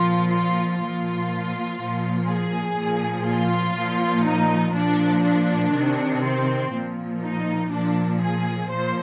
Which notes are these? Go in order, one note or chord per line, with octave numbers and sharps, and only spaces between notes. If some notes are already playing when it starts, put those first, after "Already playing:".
Already playing: A#2 F3 F4
F4
A#2 F3 F4
A#2 F3
G#4
A#2 F3
F4
A#2 F3
D#4
A#2 F3 D4
D4
C3 D#3
C4
A#2 F3
D#4
A#2 F3 D4
G#4
A#2 F3 C5